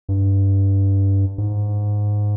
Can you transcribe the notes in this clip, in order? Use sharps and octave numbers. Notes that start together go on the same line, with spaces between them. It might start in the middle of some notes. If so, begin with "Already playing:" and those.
G2
G#2